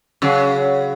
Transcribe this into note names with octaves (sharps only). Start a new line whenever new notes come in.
C#3 F#3